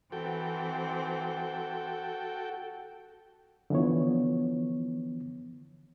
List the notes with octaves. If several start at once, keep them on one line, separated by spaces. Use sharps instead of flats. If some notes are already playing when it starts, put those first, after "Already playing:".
E3 C4 F#4 A4 G5
D3 E3 F3 B3 C#5